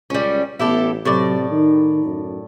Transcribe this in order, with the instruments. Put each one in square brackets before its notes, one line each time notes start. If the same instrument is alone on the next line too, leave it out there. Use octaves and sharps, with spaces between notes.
[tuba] C#2 [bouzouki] G3 C#4
[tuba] A1 [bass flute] B3 [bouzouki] E4 G4 A4
[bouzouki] A2 D5 [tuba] C3 [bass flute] F#3
[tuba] D#3 [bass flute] D#4
[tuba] F#2